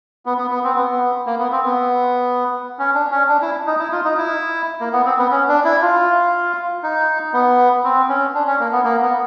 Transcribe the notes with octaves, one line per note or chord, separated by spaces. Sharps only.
B3
B3
B3
C4
B3
A#3
B3
C4
B3
C#4
D4
C#4
D4
E4
D#4
E4
F4
D#4
E4
A#3
B3
C4
B3
C#4
D4
E4
F4
D#4
B3
C4
C#4
D4
C#4
A#3
B3
A#3
B3